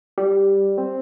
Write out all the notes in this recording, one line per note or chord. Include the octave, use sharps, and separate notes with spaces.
G3
C4